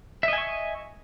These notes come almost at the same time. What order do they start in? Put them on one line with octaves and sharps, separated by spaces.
E5 D#5 G#5 C#6